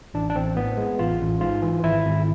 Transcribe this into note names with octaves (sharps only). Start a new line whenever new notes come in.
A1 D4
D4
A1 C4
A2 B3
G#3
A1 F4
A1
G#2 F4
E3
G#1 E4
G#1